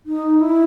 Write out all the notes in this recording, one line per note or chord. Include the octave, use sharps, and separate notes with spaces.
D#4
E4